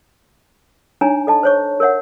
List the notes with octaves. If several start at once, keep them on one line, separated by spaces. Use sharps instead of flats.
D4 D#4 C#5 G#5 A#5 B5
A4 D#5 A5
C5 C#5 C#6
A#4 C#5 E5 F#5